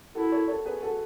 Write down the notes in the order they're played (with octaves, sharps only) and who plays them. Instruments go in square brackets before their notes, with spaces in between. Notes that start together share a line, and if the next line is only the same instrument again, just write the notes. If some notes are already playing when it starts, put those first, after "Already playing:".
[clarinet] E4 [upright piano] F#4 A4
[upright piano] A4 C#5
A4 C#5
G#4 B4
F#4 A4